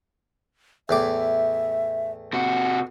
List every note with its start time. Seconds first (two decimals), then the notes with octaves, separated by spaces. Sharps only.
0.89 E2 A2 E5 D6
2.33 C3 F#4